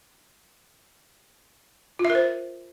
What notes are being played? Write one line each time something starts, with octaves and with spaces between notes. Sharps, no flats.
F4
E5
A#4
C5